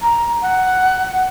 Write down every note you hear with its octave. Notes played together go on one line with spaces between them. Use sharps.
A#5
F#5